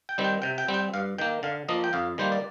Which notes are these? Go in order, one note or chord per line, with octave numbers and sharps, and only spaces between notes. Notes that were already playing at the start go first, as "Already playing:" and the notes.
G5
D#3 G3 C4
G5
C3 G5
G5
G3 C4
G5
G2 F5
D#3 A#3 G5
D3 F5
F3 A#3 D#5
G5
F2 F5
D#3 G3 A#3 C5
D5